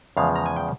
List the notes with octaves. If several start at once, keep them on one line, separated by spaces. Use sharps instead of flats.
E2 C#3 F3 G#3 F5
A#5
G#5
G5